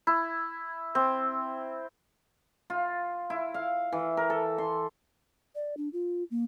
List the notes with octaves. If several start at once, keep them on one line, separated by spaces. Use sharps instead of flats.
E4
C4
F4
E4
F5
E3
A#4
A4
C6
D5
D4
F4
A#3